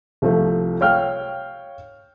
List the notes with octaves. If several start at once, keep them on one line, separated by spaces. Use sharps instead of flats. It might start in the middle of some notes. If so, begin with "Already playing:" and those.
C2 F3 A3
C#5 F5 G5 F6